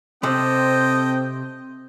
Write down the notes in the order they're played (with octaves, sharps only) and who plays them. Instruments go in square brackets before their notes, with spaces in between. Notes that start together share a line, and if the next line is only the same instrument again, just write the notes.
[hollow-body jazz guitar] C3 [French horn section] C4 [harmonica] A4 D#5 G5